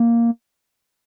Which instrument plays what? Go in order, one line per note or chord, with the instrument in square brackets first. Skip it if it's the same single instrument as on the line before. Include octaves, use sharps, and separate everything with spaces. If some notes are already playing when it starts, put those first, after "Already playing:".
Already playing: [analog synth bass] A#3